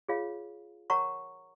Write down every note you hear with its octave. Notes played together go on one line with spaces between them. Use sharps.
F4 G#4 C#5 F5
A#4 C#5 F#5 A#5 C#6